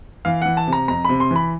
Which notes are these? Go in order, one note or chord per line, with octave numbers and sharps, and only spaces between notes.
E3 F5
E3 F#5
A5
C3
A#5
F2 A#5
C3 B5
C6
E3 B5